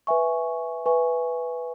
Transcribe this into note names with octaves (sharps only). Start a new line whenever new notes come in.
B4 E5 G#5 C#6
B4 E5 G#5 C#6